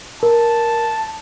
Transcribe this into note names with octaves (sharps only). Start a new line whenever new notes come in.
A#4 A5